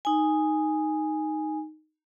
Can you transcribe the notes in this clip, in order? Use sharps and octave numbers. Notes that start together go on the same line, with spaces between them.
D#4 G#5